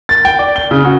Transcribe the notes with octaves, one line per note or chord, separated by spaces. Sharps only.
A6
G5
D5
G7
C#3
F#4